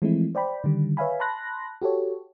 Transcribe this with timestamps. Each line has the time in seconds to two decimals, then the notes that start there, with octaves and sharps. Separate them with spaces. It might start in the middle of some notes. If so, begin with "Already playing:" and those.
0.02 E3 F3 G#3 A3 C4 E4
0.35 C5 D5 G5 B5
0.64 D3 D#3 G3
0.97 B4 C#5 E5 F5 G#5 B5
1.20 A5 B5 C6 F#6 A#6
1.82 F#4 G4 A4 C#5